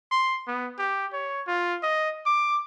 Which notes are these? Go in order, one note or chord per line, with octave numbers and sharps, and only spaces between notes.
C6
B3
G4
C#5
F4
D#5
D6